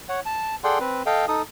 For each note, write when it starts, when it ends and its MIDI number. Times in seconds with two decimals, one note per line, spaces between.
0.09 0.20 73
0.09 0.20 78
0.26 0.55 81
0.64 0.79 68
0.64 0.79 69
0.64 0.79 74
0.64 0.79 78
0.64 0.79 79
0.64 0.79 84
0.80 1.03 60
0.80 1.03 71
1.06 1.26 69
1.06 1.26 75
1.06 1.26 77
1.06 1.26 79
1.28 1.42 63
1.28 1.42 69
1.28 1.42 87